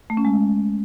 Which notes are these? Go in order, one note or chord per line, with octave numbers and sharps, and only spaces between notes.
A3
C#4
G#3